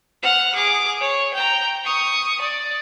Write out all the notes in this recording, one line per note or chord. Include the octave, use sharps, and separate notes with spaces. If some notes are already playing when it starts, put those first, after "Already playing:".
F#5 F6
G#4 D6
C#5
G5 A#5
C#6 D#6
D5